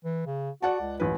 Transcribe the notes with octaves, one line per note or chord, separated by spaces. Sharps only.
E3
C#3
F#4 D5 F#5 A5
C#2
A1 B4